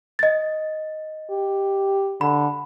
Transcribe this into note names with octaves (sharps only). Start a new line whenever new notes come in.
D#5 A6
G4
D3 B5